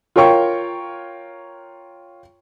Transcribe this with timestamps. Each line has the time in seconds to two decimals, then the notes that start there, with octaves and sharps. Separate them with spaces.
0.16 F4 A#4 C#5 G5 C#6